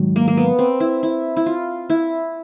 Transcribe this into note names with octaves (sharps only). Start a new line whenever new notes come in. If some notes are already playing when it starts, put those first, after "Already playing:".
Already playing: G#2 D#3 F#3
A#3
A#3
B3
C4
E4
E4
E4
F4
E4